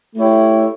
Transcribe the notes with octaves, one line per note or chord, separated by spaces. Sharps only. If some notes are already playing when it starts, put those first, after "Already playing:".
A3 E4 G4 C#5